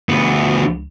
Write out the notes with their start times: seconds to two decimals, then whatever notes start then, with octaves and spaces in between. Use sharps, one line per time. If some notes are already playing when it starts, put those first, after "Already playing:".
0.09 D2 B3